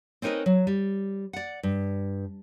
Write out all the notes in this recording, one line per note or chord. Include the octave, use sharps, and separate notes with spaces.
C4 C#4 D#4 A#4 B4 D#5
F#3
G3
D5 F#5
G2